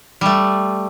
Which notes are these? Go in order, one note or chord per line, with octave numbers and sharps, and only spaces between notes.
G3 A3